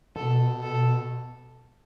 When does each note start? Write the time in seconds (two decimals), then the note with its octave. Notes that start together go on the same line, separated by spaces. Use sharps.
0.16 B2 A4
0.63 A4